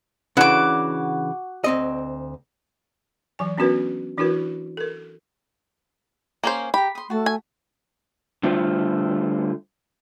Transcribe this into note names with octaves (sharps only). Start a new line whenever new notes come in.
C#3 E3 D4 F#4 D6
D2 C4 D#5
E3 F#3 G#5
B3 C#4 D4 F#4 A#4 B4
E3 D4 E4 F#4 A#4 B4
A4 A#4
A#3 C#4 G#4 C5
G4 A#5 B5
C6 D#6
A3 F#4 A5
G#5
D3 G3 A3 F4 C5